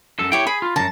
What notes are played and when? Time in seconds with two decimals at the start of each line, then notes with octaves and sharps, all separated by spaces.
0.19 F#2 A4
0.32 E4 G4 C#5 G5
0.47 G#4 B5
0.62 F4
0.76 F#2 D3 A5 A#5